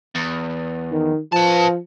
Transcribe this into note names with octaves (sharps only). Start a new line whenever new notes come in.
E2
D#3
F3 B4 A5